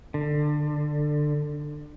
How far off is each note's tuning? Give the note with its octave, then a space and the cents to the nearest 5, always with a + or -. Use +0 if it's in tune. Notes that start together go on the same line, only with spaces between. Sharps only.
D3 +20